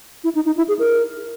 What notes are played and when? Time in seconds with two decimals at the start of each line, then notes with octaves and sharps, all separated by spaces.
0.24 E4
0.35 D#4
0.46 D#4
0.57 E4
0.68 G#4
0.79 A#4